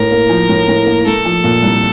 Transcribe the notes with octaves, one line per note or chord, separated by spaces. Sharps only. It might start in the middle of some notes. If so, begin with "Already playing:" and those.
Already playing: A2 A#4
A#3
F3
A2
A2
A#3
A3 A4
F3
A#2
C2